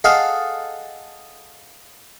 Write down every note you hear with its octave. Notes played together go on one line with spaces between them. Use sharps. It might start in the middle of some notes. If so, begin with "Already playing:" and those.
G#4 A4 D#5 F5 F#5